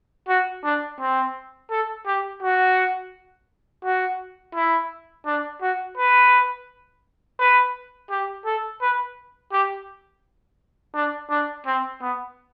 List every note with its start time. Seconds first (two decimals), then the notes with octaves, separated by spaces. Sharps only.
0.28 F#4
0.64 D4
1.00 C4
1.71 A4
2.06 G4
2.42 F#4
3.85 F#4
4.55 E4
5.26 D4
5.61 F#4
5.97 B4
7.39 B4
8.10 G4
8.45 A4
8.81 B4
9.52 G4
10.95 D4
11.30 D4
11.66 C4
12.01 B3